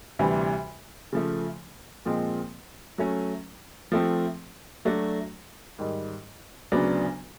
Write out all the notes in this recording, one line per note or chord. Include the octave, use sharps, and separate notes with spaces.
D2 C3 E3 G3
C#3 F3 A3
A#2 F3 G#3 C4
F#3 A3 C#4
F3 A3 C4
F#3 A3 D4 F#4
G#2 D#3 G3
D2 C#3 F#3 B3 D4